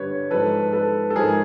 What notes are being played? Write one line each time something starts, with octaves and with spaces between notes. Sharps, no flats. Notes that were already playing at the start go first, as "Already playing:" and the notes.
Already playing: G2 D3 G3 B4 C#5
G#2 F3 A4 B4
A4 B4
A4
G#2 F3 G#4 A#4